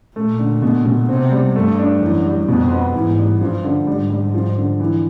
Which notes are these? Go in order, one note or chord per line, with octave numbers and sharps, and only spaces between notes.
A#2 A3
D3
B2
B2
C3 C4
G3
G2 A3
D4
F#2 E3
G3
F2 B2
B3
G#2 E3
G3
G2 F3
D3
G#2 G3
G3
F3
D3
E3